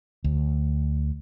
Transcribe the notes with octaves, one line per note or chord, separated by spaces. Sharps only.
D2